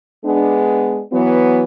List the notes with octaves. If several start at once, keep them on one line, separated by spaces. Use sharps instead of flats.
G#3 B3 D4
E3 F#3 B3